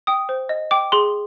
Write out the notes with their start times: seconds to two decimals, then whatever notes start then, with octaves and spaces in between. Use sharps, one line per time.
0.07 G5 D#6
0.29 C5
0.49 D#5
0.71 G5 D6
0.92 G#4 C6